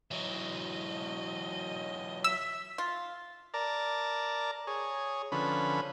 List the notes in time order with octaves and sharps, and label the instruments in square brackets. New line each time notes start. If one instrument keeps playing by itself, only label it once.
[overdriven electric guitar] E3 F#3 [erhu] D#5
[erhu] E5 [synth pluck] E6
[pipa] F4
[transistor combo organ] A#4 D5 A5 A#5
G#4 C#5
D3 F3 C#4 B4 B5